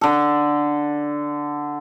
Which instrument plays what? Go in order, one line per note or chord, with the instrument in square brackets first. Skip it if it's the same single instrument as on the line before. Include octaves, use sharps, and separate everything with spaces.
[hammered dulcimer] D3 A4